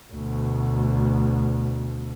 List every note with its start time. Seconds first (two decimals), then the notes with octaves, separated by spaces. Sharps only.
0.13 D2 B2